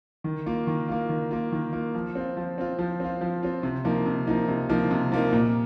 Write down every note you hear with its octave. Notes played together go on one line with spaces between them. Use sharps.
D#3
A#3 F4
D#3
A#3 F4
D#3
A#3 F4
D#3
A#3 F4
F3
C4 F4
F3
C4 F4
F3
C4 F4
F3
C4 F4
C3
F3 A#3 D#4
C3
F3 A#3 D#4
C3
F3 A#3 D#4
C3
F3 A#3 D#4
A#2